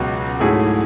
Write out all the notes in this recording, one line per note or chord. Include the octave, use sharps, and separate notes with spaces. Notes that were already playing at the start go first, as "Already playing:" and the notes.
Already playing: C#2 B2 F#3
G#2 F#3 A3 E4 G#4